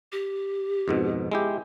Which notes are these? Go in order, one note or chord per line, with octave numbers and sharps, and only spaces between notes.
G4
F2 G#2 B2
G#3 E4 G4